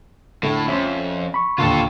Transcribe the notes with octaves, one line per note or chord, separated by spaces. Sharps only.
A2 D3 A3
F2 C#4 E5 C6
B5 C#6
D#2 A#2 D3 F4 A4